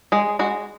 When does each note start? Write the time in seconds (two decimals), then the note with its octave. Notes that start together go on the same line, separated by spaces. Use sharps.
0.12 G#3 G#4
0.39 G#3 F#4